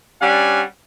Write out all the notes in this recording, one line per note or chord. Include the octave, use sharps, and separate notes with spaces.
G3 C#4 D4 F#5 G#5